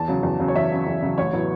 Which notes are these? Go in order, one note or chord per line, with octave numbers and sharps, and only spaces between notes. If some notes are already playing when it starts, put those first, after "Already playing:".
Already playing: E2 A5
C#3 F#3
E2
C#3 F#3
C#5
E2 E5
C#3 F#3
E2
C#3 F#3
A1 C#5
A2 F#3 B3